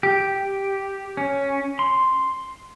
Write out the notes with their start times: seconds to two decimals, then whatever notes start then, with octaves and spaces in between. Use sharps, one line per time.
0.03 G4
1.17 C#4
1.79 C6